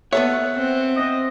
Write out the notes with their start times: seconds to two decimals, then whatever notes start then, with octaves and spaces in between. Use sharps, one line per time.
0.13 B3 A4 C#5 E5 F#5
0.55 C4
0.96 D#5